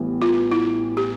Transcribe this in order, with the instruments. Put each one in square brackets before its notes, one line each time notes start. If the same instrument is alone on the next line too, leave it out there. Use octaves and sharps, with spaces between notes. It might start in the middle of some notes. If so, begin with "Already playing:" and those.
Already playing: [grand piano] A1 A2 E3 G3 B3
[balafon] F4
E4
G4